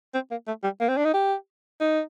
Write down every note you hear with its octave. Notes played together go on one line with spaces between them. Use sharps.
C4
A#3
A3
G3
A#3
C4
D4
D#4
G4
D#4